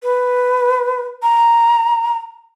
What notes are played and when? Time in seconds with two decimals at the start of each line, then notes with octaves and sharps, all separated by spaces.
0.03 B4
1.23 A#5